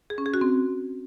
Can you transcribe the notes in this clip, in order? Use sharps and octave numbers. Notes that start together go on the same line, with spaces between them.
G#4
C#4
G#4
F#4
C4